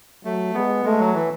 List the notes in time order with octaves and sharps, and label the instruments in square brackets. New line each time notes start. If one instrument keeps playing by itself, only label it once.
[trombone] F#3 [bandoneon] A3
[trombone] G#3 [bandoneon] B3
[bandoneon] G#3 [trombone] A3
[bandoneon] F#3
E3